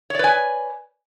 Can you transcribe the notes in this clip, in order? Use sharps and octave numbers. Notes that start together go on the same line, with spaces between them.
B4 C#5 D5 G#5